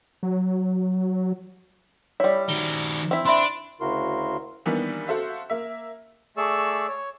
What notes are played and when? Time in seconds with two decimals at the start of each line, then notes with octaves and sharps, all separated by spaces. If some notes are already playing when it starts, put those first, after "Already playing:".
0.23 F#3
2.20 G3 E4 C#5
2.49 D#3 F#4 G7
3.11 C4 E4
3.25 D4 E5 B5 C6
3.80 D2 C#3 E4 F#4 A#4 C6
4.66 D#3 E3 G3 A#3 B3 D4
5.08 F#4 A4 C5 E5 F5
5.50 A#3 E5
6.37 A3 G#4 D5 C#6 E6
6.88 C#5